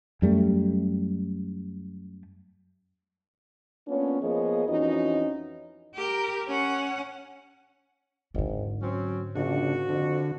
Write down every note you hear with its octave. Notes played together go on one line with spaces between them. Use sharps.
F#2 G3 A3
A#3 B3 C#4 D4 F4 C#5
F3 A#3 B3 G#4 C#5 D#5
F2 E3 C#4 D#4 F#4 D#5
G4 A#4
C#4 F#5
G#1 G#2 D3
F#3 C4 C#4
A#1 C#3 D4 F#4
F2 D3